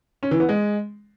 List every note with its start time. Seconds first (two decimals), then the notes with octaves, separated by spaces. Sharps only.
0.23 C#4
0.31 E3
0.40 B3
0.49 G#3